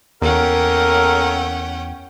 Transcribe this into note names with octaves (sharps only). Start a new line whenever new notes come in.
E2 A#3 C#4 A4 A#4 F#5 G5